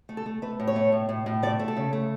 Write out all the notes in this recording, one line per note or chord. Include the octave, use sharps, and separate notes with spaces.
A3
A4
A3
A3 B4
A2
C#5
A3
A2
A2
A2
A3 D5
A3
A4
C#3
A3